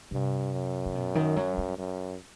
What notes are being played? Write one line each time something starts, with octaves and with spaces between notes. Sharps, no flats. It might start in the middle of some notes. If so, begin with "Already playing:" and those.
G2 C3
F#2
C3
B2
D#3
F#3
G3
F#2